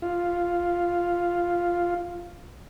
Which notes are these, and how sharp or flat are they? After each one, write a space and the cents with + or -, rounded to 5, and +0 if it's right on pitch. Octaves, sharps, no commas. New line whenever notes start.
F4 +0